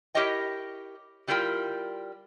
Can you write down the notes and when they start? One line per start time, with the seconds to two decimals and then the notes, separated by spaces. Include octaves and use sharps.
0.15 E4 G4 A#4 C#5 D#5 G5
1.27 D3 G3 E4 F4 A#4 G5